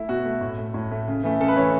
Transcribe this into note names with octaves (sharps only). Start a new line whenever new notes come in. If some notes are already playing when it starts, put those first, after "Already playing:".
Already playing: A3 E4
B2 F#4
A3
A2
A3
A2
A3
C#3
E3 A3
C#3 A4
B4
E3 A3 C#5